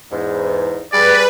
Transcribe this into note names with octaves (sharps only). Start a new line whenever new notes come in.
E2 G#2
G3 G#4 B4 D5